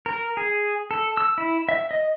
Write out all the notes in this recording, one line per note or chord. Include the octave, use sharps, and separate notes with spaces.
A#4
G#4
A4
E6
E4
E5
D#5